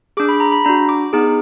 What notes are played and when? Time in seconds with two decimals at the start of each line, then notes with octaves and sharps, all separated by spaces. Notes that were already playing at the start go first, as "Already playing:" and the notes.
0.17 D4 G#4 D6
0.29 B5
0.40 A#5
0.52 B5
0.65 D4 F#4 A#5
0.89 D6
1.13 B3 D#4 G#4